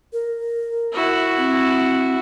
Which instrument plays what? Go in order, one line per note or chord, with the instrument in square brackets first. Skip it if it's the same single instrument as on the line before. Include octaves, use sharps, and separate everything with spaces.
[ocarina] A#4
[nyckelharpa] E4 F#4
[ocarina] C4